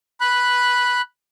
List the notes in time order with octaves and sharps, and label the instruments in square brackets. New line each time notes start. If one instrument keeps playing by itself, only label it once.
[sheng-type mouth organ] B5 F#6